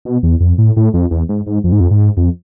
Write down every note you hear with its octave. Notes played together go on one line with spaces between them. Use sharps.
B2
E2
F2
A2
A2
F2
E2
G#2
G#2
F2
G#2
F2
G#2
F2